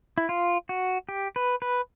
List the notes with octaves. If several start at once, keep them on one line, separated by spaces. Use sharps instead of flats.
E4
F4
F#4
G4
B4
B4